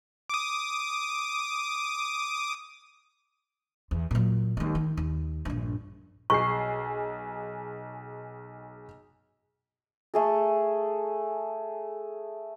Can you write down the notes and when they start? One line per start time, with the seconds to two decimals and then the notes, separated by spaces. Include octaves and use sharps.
0.30 D6 D#6
3.91 E2
4.11 A#2 F#3
4.57 D#2 G#3
4.75 D#3
4.97 D#2
5.45 A#1 G2
6.30 B1 G#4 C#6 C7
10.14 A3 G#4 A4